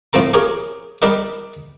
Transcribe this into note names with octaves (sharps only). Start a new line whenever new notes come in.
A2 F3 C4 A4 A#5
G4 G#4 A#4 C#5
G3 D4 G4 A#4 D#5